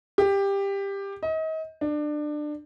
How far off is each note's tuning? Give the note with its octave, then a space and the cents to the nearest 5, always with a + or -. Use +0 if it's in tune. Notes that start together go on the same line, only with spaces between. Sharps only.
G4 +15
D#5 +35
D4 +25